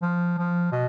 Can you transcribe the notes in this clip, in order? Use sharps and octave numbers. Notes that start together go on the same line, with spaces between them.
F3
F3
B2